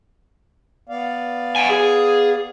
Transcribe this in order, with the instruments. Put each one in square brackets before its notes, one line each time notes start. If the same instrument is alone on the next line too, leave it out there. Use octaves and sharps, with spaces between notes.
[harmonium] B3 D5 F5
[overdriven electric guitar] F#5 G#5
G#4